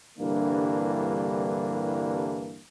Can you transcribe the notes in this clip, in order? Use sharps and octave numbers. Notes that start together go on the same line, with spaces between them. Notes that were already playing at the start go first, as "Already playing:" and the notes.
C2 G2 D3 E3 A#3 D4